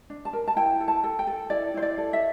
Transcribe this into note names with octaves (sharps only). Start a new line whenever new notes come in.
D4
A5
A#4
A5
E4 G5
A4
A5
A4
G5
A4
E4 D5
E4 C5
D5
A4
E5